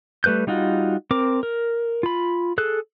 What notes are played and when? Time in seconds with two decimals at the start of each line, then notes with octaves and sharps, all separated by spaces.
0.24 G3 A3 B4 F#6 G6
0.47 G3 D#4 F4 F#4
1.11 C4 A#4 D6
1.43 A#4
2.03 F4 B5
2.58 G#4 A4 F#6